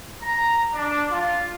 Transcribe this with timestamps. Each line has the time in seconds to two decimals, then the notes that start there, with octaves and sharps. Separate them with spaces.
0.22 A#5
0.74 D4
1.11 F4